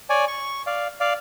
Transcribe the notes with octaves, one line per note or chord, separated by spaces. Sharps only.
C#5 D5 G#5
C#6
D5 F5
D5 F5